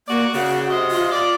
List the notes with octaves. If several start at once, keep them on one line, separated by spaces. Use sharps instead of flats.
A#3 F#4 D5
C#3 F#4
C3 C5 D#5
F4
D5